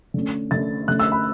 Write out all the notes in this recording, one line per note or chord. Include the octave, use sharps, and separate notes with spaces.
D3 A3 C#4
D3 A3 C#4 A6
D3 A3 C#4 F#6
E6
B5